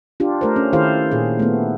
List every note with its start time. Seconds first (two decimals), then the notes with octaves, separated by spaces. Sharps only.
0.20 D4 F4 G4
0.41 A3 A#4 C5
0.56 C#4
0.73 D#3 E4 G4 A4 C5 F5
1.12 A#2 G#4
1.39 A3 B3